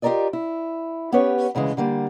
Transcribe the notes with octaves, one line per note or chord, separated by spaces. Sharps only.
F4 G4 A4 A#4 D5 D#5
E4
B3 C#4 G4 B4 C#5
D2 C#3 E3 G#3
D3 G3 A#3